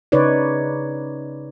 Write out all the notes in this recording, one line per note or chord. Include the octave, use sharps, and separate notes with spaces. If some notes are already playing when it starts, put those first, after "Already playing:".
C#3 D#4 B4 C#5 D5